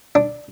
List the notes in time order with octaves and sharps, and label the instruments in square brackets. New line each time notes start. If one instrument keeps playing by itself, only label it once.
[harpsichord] D4